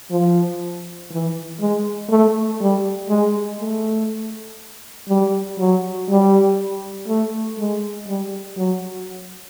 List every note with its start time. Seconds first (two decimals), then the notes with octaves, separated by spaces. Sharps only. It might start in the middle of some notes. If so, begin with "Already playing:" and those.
0.11 F3
1.11 E3
1.60 G#3
2.10 A3
2.60 G3
3.09 G#3
3.60 A3
5.09 G3
5.59 F#3
6.09 G3
7.08 A3
7.59 G#3
8.07 G3
8.57 F#3